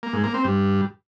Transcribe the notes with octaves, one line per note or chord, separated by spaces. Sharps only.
A#3
G#2
A#3
C4
G2